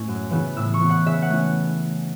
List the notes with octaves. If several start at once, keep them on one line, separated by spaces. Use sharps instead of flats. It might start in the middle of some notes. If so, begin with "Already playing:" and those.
Already playing: A2 A3 B3 C#4
F#2
C#3 E3 B3 E4
A2 E6
C#6
E3 B3
F#5
C#3 E5
F#5
A3 C#4 E4